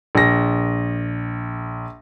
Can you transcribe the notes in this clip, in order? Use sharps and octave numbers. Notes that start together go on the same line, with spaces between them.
A#1 A#6